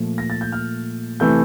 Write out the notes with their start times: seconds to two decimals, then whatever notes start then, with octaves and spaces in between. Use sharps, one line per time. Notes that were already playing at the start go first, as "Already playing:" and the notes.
Already playing: A#2 F3 A3
0.18 A#6
0.30 A6
0.41 G6
0.52 F6
1.20 C3 E3 A3 E4 G6